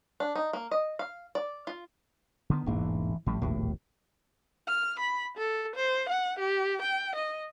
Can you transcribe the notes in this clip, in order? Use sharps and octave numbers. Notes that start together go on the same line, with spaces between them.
D4
D#4
A#3
D#5
F5
D5
F4
D3 D#3 B3
E1 A1 G#2 E3 A#3
A1 A2 F3 G3
E1 A#1 D#2 A2
F6
B5
A4
C5
F#5
G4
G5
D#5